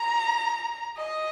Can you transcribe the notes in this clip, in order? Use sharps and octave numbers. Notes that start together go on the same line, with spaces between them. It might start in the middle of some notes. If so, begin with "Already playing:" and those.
Already playing: A#5
D#5